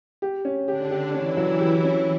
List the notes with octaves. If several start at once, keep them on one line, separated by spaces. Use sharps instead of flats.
G4
C#4
D3 D4 G4
G4
E3 C#4 E4
F#3
G4
C#4